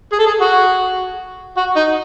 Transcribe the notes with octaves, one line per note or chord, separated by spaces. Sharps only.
G#4
A4
G#4
F#4
F#4
D#4